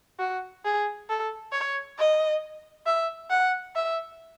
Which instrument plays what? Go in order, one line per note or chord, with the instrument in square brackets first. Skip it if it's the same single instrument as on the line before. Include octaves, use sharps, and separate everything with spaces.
[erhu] F#4
G#4
A4
C#5
D#5
E5
F#5
E5